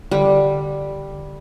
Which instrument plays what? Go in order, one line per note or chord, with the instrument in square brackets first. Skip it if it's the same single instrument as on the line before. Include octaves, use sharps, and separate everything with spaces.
[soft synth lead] D3 [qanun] G3